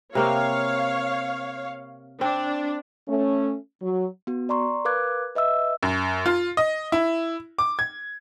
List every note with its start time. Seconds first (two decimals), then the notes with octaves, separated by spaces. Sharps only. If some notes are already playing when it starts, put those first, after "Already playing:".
0.15 C3 A#3 C4 C#5 F5
2.21 C4 D4
3.08 A3 C#4
3.81 F#3
4.27 B3 F#4
4.49 D5 A#5 C6 C#6
4.85 A#4 B4 F5 D6 F#6 G#6
5.35 B4 D#5 E5 E6
5.83 F#2
6.26 F4
6.57 D#5
6.92 E4
7.58 D6
7.79 G#6